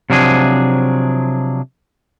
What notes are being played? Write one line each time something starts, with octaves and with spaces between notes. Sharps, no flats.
C3 F3 F#3 D4 G#4